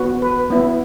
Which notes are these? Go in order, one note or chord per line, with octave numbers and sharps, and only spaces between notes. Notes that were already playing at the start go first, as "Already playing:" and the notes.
Already playing: B3 F#4
B4
B3 E4